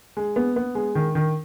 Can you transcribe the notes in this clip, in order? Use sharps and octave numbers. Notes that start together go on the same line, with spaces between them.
G#3
B3
B3
G#3
D#3
D#3